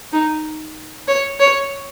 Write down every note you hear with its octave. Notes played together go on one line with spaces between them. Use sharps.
D#4
C#5
C#5